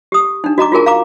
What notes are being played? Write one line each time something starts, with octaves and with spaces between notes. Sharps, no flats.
G4 D#6
D4 D#4
F#4 D#5 A#5 D6
F4 F#4 G#4 A#4 G#5
F5 A#5 D6